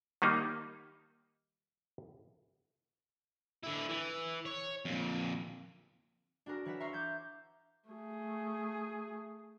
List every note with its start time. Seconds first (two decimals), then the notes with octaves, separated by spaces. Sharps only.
0.22 D#3 G3 A#3 D#4
3.63 D3 E4
3.89 E3
4.46 C#5
4.85 F2 A#2
6.46 D4 F#4 G#4 A#4
6.65 E3 C#5 F#5 B6 E7
6.80 E5 A#5 C6 C#6 F6 C7
6.93 D6 G6 G#6
7.90 A3 G#4